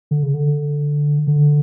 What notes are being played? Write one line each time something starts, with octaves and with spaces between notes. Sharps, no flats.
D3
C#3
D3
D3